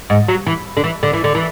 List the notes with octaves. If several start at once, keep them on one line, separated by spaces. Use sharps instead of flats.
G#2
F#3
E3
D3
E3
D3
E3
D3
E3